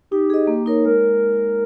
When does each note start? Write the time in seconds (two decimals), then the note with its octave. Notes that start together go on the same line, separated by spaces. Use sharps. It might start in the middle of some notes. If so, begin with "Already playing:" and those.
0.11 D#4 G4
0.30 G#4 D#5
0.47 A#3
0.66 D#4 A#4 C#5
0.85 G#3 A#4